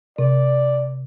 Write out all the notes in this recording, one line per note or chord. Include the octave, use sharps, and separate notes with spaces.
C3 D5